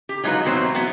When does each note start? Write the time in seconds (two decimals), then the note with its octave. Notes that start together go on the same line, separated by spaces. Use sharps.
0.09 G4
0.24 F#3 G#3 D#4 F4 F#4 B4
0.46 E2 B2 F#3 C4 C5
0.75 E3 F#3 B3